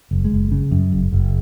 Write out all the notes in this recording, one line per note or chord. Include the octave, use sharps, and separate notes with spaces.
F#1
G#3
F#1
C#3
F#2
F#1
F#1